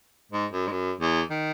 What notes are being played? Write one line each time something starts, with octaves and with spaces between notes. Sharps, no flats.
G#2
F#2
G#2
F#2
E2
D#3